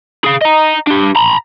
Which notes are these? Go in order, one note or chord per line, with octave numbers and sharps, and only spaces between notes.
G#4 F5
D#5 A#5
D4 G4
A#5 B5